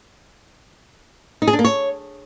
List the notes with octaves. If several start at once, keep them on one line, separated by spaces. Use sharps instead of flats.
D#4
G#4
D4
A#3
C#5